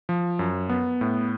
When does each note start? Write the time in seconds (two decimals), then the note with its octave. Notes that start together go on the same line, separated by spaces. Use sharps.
0.09 F3
0.39 F#2
0.69 B3
1.01 A2